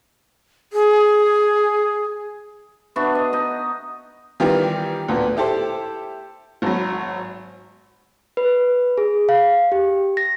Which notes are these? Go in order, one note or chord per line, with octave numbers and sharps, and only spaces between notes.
G#4
B3 D4 F#4 E5
D#5
D#4 D#5
D#3 E3 G3 B3 F4 G4
D2 A#2 B3
E4 G4 A4 C5
G#1 F#3
B4
G#4
F5
G4
A#6